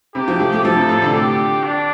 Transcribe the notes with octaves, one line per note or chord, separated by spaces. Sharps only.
C3 G4
F3
A3
A3
F3 A4
C3
A2
D3
G4
D4